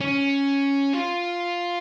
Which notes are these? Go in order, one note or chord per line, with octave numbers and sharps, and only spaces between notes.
C#4
F4